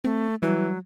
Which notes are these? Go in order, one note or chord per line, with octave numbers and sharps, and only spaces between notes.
A3 C4
E3 F#3 G3